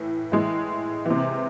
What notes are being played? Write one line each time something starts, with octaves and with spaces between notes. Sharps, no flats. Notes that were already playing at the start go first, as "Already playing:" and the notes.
Already playing: A2 E3
A2 E3 G#3
C3 E3